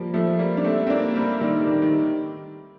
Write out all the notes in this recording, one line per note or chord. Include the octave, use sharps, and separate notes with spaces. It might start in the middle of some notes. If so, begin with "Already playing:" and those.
Already playing: F3 G3 A#3
F3 A3
G3 A#3
D4
A3 C4
C4
A#3 D4
G3 A#3
D#3 G3
D#3
D#3